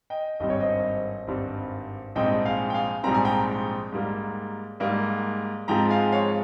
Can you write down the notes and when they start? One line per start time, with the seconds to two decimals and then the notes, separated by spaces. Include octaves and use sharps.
0.10 D#5 G5
0.40 G#1 G2 G3 C4 D#5
0.50 C#5
0.60 C5 D#5
1.27 G#1 G2 G3 C4
2.15 A#1 G#2 G3 C4 D#5 G5
2.45 F5 G#5
2.70 G5
2.74 F5 G#5
3.04 A#1 G#2 G3 C4 A#5
3.14 G#5
3.25 G5 A#5
3.92 G#2 G3 A#3
4.80 G#2 G3 A#3
5.68 G#2 F3 G#3 C4 G5 A#5
5.90 F5 G#5
6.12 C#5 F5